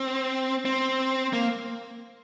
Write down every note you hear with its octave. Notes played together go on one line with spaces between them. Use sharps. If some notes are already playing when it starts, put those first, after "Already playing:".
Already playing: C4
C4
A#3